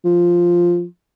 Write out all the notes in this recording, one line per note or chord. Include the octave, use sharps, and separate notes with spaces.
F3